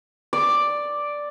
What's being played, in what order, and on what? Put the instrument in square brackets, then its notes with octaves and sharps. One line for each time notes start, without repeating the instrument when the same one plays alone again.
[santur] D5